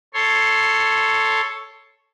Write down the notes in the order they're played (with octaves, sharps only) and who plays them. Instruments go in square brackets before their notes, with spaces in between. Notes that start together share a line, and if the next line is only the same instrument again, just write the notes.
[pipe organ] A4 C#5 C6